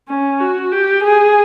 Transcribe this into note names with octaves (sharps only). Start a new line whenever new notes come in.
C#4
F#4
G4
G#4